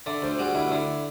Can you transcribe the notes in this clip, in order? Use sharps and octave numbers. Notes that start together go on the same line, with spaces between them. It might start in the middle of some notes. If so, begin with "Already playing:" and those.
D3 D5 E5
D2 C5 D5
G3 F#4 G#4
D2 E4 F#4
D3 D4 E4